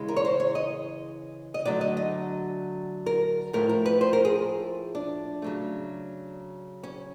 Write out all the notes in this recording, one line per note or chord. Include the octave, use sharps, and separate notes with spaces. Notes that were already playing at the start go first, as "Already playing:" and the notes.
Already playing: C#3 E3 G#3
A#4
C#5
C5
C#5
D#5
D#5
D3 F#3 A3 D5
D#5
D#5
A#4
A2 F3 A3 A#4
A#4
B4
C5
A#4
G#4
D4
C#3 F#3 A3
C#4